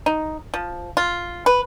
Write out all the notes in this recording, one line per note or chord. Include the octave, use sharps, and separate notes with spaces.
D#4
F3
F4
B4